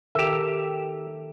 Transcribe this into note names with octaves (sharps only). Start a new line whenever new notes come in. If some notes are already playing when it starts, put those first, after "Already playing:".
D#3 G4 A4 A#4 E5